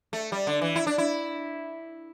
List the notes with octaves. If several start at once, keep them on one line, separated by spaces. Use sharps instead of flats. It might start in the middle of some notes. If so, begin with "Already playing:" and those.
A3
G3
D3
E3
E4
D4
E4